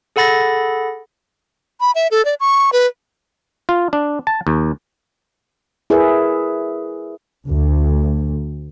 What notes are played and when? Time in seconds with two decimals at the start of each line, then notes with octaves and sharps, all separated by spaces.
0.16 G#4 A4 F#5 B5 A6 A#6
1.81 B5
1.95 E5
2.11 A4
2.25 D5
2.40 C#6
2.73 B4
3.69 F4
3.93 D4
4.27 A5
4.47 D#2
5.90 E4 G#4 A#4 B4 E5
7.49 D2